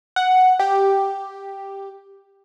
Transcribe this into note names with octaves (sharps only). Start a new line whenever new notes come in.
F#5
G4